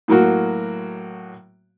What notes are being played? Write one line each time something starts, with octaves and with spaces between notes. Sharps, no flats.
A2 F#3 A#3 F#4